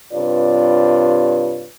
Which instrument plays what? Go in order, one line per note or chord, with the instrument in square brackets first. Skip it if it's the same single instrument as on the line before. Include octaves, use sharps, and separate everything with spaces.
[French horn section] G2 C3 F4 B4 C#5 D5